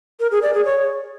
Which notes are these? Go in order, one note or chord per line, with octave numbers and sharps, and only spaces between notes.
A#4
G#4
D5
G#4
C#5